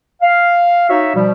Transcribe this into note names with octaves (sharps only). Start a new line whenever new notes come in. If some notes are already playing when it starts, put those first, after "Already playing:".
F5
D#4 F#4 C#5 E5
B2 F3 G3